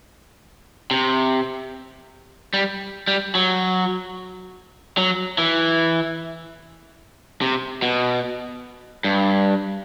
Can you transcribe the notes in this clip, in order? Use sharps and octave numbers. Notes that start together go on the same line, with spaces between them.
C3
G3
G3
F#3
F#3
E3
C3
B2
G2